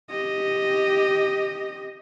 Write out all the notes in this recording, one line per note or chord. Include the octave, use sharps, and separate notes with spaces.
G4 D#5